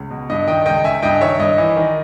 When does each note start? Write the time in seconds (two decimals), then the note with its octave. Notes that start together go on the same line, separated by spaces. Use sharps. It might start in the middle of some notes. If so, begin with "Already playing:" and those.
Already playing: C#2
0.11 B2
0.30 G2 D#5
0.47 D#3 D#5 G5
0.66 C#2 D#5 G5
0.84 C#2 E5 G#5
1.03 G2 D#5 G5
1.21 D#3 C#5 E5
1.39 G2 D#5
1.58 E3
1.77 D#3